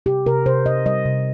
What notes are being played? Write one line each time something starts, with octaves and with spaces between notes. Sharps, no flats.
C3 G4
C3 A#4
C3 C5
C3 D#5
G3 D#5
C3